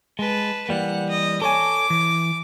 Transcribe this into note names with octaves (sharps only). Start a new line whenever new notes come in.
G#3 B4 A5
E3 G3 A#3 F#5
D#5
A4 C#5 G#5 D6
E3